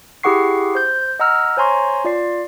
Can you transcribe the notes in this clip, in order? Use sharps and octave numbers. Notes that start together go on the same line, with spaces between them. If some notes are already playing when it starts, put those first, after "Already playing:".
E4 G4 G#4 F#5 C#6 C7
C5 G6
D#5 F#5 A#5 E6 F6
C5 C#5 G#5 A#5 C6 C#6
F4 D5 C7